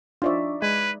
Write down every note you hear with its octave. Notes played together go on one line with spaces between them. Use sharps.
F3 D4 D#4 F4 D5 E5 C#6
G#3 B4 G#6